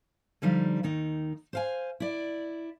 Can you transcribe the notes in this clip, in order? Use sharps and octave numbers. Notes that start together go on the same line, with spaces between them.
D3 F3 G3 D#4 F5
D#2 D#3 D#4
C5 F5 G#5
E4 D5